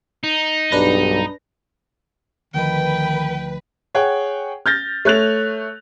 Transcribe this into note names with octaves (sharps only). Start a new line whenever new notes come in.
D#4
B1 G2 D4 B4 A#6
D2 D#3 F3 B4 D#5 G5
G#4 C#5 F#5 G5
F6 G6 A6 A#6
A3 C#5 F#6 A6 F7